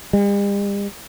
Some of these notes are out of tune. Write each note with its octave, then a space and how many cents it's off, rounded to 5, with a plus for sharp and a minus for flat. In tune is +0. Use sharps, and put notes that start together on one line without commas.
G3 +45